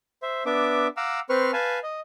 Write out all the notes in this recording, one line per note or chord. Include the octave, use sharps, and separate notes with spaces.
C5 E5
B3 D4 E5 D6
F5 F#5 A#5 D6 E6
C4 B4 C5 C#6 F6
B4 F5 G#5 A5
D#5